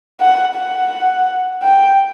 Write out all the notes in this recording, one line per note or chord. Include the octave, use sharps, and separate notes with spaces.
F#5
F#5
G5